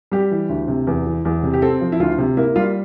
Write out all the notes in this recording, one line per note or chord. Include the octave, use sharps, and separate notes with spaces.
G3 G4
E3
D2
C3
E2
E3
E2
C3
G4
C4 A4
F3
E4
D2 F4
C3
A#3 E4
G3 F4